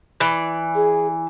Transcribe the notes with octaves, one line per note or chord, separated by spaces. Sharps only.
E3 D5
G#4